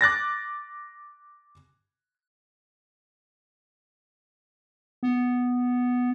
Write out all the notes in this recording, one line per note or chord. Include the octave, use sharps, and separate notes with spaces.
D6 F#6 A6 A#6
B3